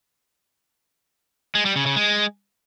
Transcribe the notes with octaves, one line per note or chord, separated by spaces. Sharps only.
G#3
G3
C#3
C#3
G#3